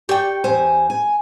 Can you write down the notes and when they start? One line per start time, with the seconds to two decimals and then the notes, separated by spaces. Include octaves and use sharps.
0.09 G4 D5 G5 C#6
0.44 E2 C5 G#5
0.90 G#5